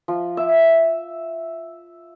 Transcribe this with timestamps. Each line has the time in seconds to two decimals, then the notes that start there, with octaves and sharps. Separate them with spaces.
0.08 F3
0.37 E5